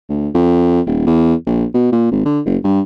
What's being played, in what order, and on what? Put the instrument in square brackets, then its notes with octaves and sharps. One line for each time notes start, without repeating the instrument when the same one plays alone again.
[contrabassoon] D2
F2
D#1
E2
A#1
B2
A#2
G#1
D3
F#1
G2